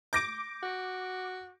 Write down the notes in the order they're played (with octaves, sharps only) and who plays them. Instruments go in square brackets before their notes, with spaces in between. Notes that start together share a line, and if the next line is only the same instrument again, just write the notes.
[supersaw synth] D6 [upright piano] G6 A#6 D7
[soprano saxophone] F#4